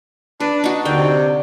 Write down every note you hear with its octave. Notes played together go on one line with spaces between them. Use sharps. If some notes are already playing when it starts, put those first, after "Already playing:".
D4 B4
D#4 F#4
D#2 D3 G5
C3